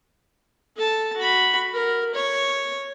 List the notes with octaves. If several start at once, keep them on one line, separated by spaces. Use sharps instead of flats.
A4 A5
F#4 B5
A#4
C#5